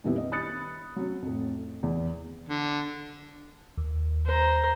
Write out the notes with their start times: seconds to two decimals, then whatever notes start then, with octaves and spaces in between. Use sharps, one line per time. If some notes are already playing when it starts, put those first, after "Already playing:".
0.04 F2 A#2 D#3 G3 B3 E4
0.18 D#5
0.32 B5 D#6 F#6 A6 C#7
0.96 F#3 C#4
1.22 F2 A2
1.83 E2
2.49 D3
3.78 D#2
4.26 C5 A#5